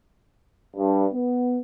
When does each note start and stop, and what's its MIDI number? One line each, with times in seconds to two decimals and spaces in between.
0.76 1.06 43
1.13 1.58 59